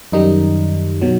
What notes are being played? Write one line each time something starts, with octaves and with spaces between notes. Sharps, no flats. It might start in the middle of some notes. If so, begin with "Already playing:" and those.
F#2 D#3 G3 D#4
B2 F#3